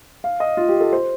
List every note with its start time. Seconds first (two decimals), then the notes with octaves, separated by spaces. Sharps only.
0.24 F5
0.40 D#5
0.57 F4
0.69 G4
0.80 A4
0.93 C5